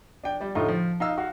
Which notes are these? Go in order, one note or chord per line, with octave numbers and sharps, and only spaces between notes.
D4 G5
G3 D5
A2 D3 A3 D#4 F4
F3
D#4 F5 E6
F#4 F5